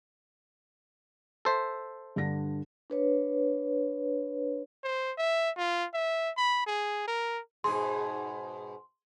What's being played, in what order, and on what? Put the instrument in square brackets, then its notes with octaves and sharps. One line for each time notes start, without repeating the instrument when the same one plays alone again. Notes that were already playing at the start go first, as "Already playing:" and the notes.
[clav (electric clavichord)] A4 C5 E5
[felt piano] G2 D3 A#6
[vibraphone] D4 B4 C#5
[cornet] C5
E5
F4
E5
B5
G#4
A#4
[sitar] G#2 B2 G#4 [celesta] C6